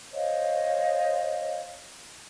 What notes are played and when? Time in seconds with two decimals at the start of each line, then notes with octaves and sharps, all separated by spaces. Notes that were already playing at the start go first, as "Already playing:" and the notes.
0.12 C5 C#5 D#5 F5